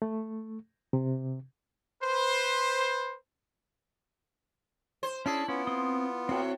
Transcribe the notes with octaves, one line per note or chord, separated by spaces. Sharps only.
A3
C3
B4 C5
C5
C#4 D4 E4 G#4 A5
B3 C#4 F4
C4 C6 D#6
A2 C4 F#4